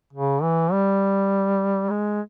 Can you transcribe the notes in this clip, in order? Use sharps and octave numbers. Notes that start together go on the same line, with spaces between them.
C#3
E3
G3
G#3